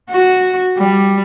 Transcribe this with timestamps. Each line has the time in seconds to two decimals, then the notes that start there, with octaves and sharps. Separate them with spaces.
0.10 F#4
0.78 G3